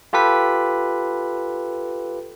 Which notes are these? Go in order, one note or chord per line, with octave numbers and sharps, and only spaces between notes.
F4 G4 A4 B4 B6